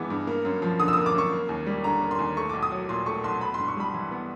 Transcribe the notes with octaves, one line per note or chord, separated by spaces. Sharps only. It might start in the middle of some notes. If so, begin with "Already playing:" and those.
Already playing: G2 E3 G#3 B3 D6
G2
A#3
F#2
F3
D3 D#6
E6
D#6
A#3
D6
F#2 C#6
A#3
D#2
G3
D3 A#5
A#3
C6
D#2
A3 C#6
B1 D6
D#6
F#3
A#2 C6
A3 C#6
B1 C6
B3 B5
G2 C6
C#6
G3 B5
E3
B3